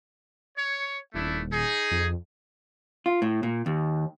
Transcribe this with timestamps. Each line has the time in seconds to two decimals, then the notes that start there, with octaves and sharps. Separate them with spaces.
0.57 C#5
1.14 D#1 A3 D4 E4
1.52 D#4 G#4
1.91 F2
3.06 F4
3.22 A2
3.43 A#2
3.66 D#2